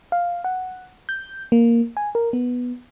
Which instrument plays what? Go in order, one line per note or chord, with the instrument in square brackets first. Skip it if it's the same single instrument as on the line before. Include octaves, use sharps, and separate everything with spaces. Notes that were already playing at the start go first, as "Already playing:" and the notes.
[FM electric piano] F5
F#5
G6
A#3
G#5
A#4
B3